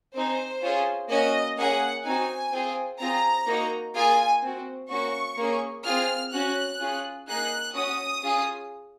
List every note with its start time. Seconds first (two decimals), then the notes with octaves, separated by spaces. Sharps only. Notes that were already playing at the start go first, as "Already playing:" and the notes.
0.15 C4 D#4 G#4 C5
0.62 C#4 F4 G#4
1.09 A#3 C#4 F#4 D#5
1.56 A#3 C#4 G#4 F#5
2.04 C4 D#4 F#4 G#5
2.52 C4 F4 G#4
2.99 C4 F4 G#4 A#5
3.47 A#3 D#4 F#4
3.95 A#3 F4 G#4 G#5
4.42 C4 F#4
4.90 A#3 C#4 F#4 C#6
5.37 A#3 C#4 G#4
5.85 C4 F4 G#4 F6
6.32 C#4 F#4 F#6
6.80 C#4 F4 G#4
7.27 A#3 D#4 G#4 F#6
7.74 C#4 F#4 D#6
8.22 C#4 F4 G#4